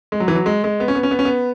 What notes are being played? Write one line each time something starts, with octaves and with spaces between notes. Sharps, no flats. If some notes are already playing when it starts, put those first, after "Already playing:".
G#3
F#3
E3
F#3
G#3
G#3
B3
C#4
B3
C#4
B3
C#4
B3